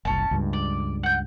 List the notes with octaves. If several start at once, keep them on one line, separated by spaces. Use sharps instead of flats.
F#1 C2 C#4 A5
C#2 G2
D5
F#5 G6